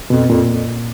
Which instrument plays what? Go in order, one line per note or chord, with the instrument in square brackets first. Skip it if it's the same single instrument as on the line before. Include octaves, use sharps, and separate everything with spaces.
[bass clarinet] F2 [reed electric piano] B2
[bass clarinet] F2 [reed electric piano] A#2
[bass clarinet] F2